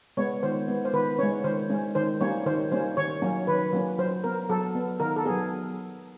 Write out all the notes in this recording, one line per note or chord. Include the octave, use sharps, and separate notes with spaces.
G#3 B3 C#5
D#3 C5
G#3 B3
C5
D#3 B4
G#3 C#4 C#5
D#3 C5
G#3 C#4
D#3 C5
G3 A#3 C#4 C#5
D#3 C5
G3 A#3 C#4 C5
D#3 C#5
F#3 A#3 C#4
D#3 B4
F#3 A#3 C#4
F#3 C5
B3 A#4
F#3 A4
B3
D#3 A#4
A4
F#3 B3 G#4